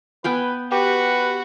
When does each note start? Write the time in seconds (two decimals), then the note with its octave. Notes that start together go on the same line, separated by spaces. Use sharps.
0.24 B3 B4 G5 G#5
0.72 F#4 G4 B4